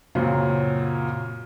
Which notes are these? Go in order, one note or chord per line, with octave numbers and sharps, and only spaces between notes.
F#2 A#2 C#3 F#3 C4